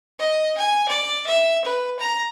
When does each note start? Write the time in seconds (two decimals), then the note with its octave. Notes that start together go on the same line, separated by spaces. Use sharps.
0.19 D#5
0.57 G#5
0.89 D5
1.27 E5
1.65 B4
1.99 A#5